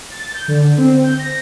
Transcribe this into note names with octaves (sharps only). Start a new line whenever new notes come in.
A6
G6
D3
C4
G6
A#6